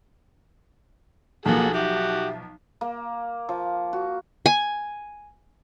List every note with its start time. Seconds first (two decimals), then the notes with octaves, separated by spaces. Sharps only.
1.46 B1 F3 A#3 F#4 G#4 A4
1.74 F#4 G4 E5
2.81 A#3
3.49 F3
3.93 F#4
4.46 G#5